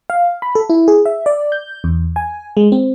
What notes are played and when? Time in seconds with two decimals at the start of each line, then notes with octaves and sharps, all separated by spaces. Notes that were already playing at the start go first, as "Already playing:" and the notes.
0.10 F5
0.42 B5
0.55 A4
0.70 E4
0.88 G#4
1.06 E5
1.26 D5
1.52 G6
1.84 E2
2.16 G#5
2.57 G#3
2.72 C4